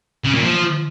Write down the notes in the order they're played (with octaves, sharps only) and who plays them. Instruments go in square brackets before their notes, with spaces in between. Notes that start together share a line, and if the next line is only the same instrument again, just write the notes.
[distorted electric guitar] C#3
A#2
F3